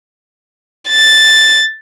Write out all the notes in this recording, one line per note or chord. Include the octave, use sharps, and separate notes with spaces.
A6